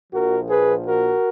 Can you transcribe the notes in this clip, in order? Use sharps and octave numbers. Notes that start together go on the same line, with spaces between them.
A#1 A#2 F3 F#4 A#4
G#4 B4
F#4 A#4